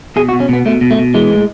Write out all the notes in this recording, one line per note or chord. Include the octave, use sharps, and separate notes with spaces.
B2 G#4
F#4
B2
C#4
B2 B3
B2 A3
B2
A3
B2
E3 G#3
A2